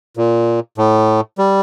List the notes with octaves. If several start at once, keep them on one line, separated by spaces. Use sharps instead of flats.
A#2
A2
G3